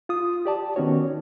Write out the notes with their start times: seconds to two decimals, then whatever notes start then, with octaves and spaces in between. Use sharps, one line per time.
0.09 F4 D#6
0.45 G4 D5 A5
0.76 D#3 B3 C#4 F#4 C#5